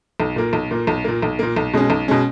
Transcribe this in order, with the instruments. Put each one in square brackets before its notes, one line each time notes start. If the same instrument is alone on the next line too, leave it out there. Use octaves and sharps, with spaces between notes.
[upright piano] B1
A#2 A#3
B1
A#2 A#3
B1
A#2 A#3
B1
A#2 A#3
B1
B2 G#3 C#4
B1
B2 G#3 C#4